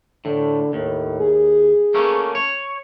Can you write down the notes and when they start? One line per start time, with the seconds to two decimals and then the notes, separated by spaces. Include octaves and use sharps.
0.25 A2 D3
0.73 D#2 A2
1.20 G#4
1.94 A3 A#3 C#4
2.35 C#5